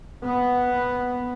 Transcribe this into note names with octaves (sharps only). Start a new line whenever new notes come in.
B3